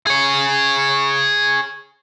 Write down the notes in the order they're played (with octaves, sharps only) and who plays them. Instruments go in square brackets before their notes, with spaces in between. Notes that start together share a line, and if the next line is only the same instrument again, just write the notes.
[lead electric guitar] G#4 C#5